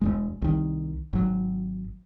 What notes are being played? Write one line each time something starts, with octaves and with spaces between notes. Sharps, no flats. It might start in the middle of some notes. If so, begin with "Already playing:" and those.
E1 E2 G#3
C2 D#3
G#1 F#3